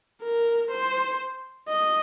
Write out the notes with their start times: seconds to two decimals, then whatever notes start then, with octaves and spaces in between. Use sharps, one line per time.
0.22 A#4
0.71 C5
1.69 D#5